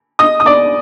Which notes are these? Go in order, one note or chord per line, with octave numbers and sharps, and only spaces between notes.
D#5 D#6
D#6
D5 D6